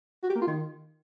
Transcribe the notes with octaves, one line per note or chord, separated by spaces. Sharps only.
F#4
G4
A#3
F4
D#3